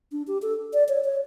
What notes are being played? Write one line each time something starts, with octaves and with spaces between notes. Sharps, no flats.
D4
G4
A4
D5
C#5
C#5